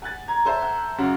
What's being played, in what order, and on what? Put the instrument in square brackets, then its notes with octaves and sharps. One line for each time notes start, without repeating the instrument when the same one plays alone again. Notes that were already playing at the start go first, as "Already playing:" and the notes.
[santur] F#5 [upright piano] G#5 F#6 A6
[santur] A#5 [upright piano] G#6
[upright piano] A4 C5 E5
[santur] F#5
[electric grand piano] F#2 C#3 F#4